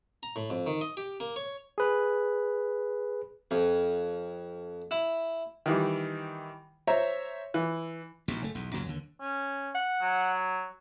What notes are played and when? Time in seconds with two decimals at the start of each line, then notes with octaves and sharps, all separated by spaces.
0.23 A#5
0.36 A2
0.50 F2
0.67 D#3
0.81 D#5
0.97 G4
1.20 A#3
1.36 C#5
1.78 G#4 B4
3.51 F2
4.91 E4
5.66 D#3 E3 G3
6.87 C5 C#5 E5 A#5
7.54 E3
8.28 A#1 D#2 B2
8.42 F#1 A3
8.55 B1 E2
8.74 C#2 F#2 A#2 F#3
8.86 D#2 D3
9.21 C#4
9.75 F#5
10.02 F#3